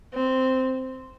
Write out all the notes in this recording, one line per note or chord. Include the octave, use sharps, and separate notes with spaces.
C4